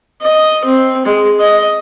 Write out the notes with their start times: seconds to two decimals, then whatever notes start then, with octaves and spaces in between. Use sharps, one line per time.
0.22 D#5
0.65 C4
1.06 G#3
1.40 D#5